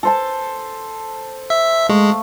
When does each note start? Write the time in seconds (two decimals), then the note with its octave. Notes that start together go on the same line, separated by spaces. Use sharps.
0.03 A4 C5 A5
1.50 E5
1.89 G#3 A3 F5